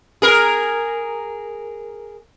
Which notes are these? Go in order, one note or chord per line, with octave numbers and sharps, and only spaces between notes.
G#4 A#4